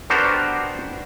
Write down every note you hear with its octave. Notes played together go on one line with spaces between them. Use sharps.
B3 D4 F#4 G4 A#4 C5